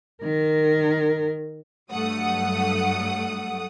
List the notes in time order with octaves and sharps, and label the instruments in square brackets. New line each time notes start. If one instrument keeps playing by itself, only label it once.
[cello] D#3 A#4
[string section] G2 F#3 A3 F#5 D#6